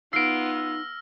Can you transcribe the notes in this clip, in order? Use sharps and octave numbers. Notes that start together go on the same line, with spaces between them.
B3 D#4 F4 E6 F6 A#6 C7 D7